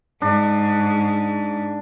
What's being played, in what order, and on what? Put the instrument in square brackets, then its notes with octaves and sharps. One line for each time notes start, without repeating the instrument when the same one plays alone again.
[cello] G#2 [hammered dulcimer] D4